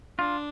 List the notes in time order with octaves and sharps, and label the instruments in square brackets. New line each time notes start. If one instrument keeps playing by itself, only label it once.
[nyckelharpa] D4 [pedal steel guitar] F4